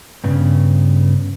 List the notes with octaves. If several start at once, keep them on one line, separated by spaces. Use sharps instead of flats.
G2 C#3 B3